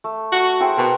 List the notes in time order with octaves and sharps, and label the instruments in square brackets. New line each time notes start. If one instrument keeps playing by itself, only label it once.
[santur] A3
[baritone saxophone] F#4
[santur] E4 G#4 C5 [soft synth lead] G5
[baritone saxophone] B2 [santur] A#4